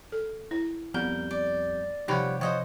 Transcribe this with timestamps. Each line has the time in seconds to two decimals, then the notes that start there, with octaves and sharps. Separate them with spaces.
0.12 A4
0.51 E4
0.94 F2 G3 B3 A#4 G6
1.31 D5
2.08 C3 F3 G3 D#4 G4 C#5 F#5 B5
2.41 F3 F4 C5 C#5 D#5 F#5 D#6 E6